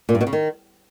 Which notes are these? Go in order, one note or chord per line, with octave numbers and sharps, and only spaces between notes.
A#2
G2
B2
C#3
D#3